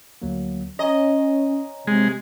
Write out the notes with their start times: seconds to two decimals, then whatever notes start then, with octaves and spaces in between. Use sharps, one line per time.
0.22 D2 F#3 A#3
0.79 C#4 C#5 D#5 G#5 A#5
1.87 C3 G#3